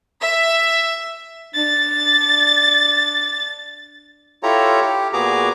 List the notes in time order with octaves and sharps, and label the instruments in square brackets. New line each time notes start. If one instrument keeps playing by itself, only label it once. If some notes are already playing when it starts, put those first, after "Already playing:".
[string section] E5
[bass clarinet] D4 [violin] A6
[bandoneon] E4 F4 G4 A4 C#5 A#5
G4
A#2 B3 F#4 G#4 A#5 D6